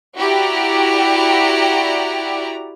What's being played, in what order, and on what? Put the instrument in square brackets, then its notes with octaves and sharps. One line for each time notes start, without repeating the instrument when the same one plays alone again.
[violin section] E4 F#4 G4 D5 A#5